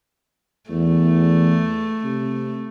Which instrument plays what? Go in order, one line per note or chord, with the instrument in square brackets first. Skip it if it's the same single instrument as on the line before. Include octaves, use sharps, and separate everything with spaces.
[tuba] E2 [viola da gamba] A3
[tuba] C3